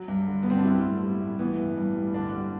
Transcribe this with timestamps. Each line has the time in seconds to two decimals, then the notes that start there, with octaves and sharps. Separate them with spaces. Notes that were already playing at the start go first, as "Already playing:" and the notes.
Already playing: F#3 F#4
0.08 G2
0.27 D3
0.43 B3
0.46 D3 C4
0.57 D4
0.64 G3 E4
0.83 A2
1.03 G3
1.20 A2
1.39 E3 B3
1.58 G2
1.77 G2
1.96 G3
2.14 D3 D4
2.33 G3